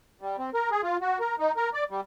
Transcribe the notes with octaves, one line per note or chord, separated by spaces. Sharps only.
G3
C4
A#4
G#4
F4
F#4
A#4
D#4
A#4
D5
G3